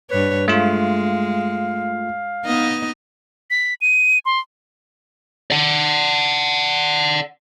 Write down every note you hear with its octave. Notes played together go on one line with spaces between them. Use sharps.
G2 B4 C#5
G#3 A3 F4 F5
B3 D#4 D#5
B6
D#7
C6
D5 F#5